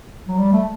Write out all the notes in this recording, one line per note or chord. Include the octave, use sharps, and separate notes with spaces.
F#3
G3
A3